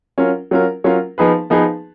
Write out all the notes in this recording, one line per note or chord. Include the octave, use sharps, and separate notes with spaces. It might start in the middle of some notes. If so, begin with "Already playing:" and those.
F#3 C#4 F4 A#4
F#3 C#4 F4 A#4
F#3 C#4 F4 A#4
F3 B3 D#4 G#4 B4
F3 B3 D#4 G#4 B4